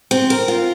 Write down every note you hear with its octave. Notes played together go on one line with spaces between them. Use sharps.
C4
A#4
F4